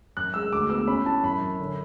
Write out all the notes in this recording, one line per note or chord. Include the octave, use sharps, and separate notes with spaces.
F#2 F#6
G#3 E6
D2 D6
B3 E6
C#4 B5
E4 A5
F#2 B5
F#2
D3